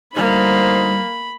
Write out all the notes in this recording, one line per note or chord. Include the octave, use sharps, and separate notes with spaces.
D2 G3 A#3 D#4 C5 B5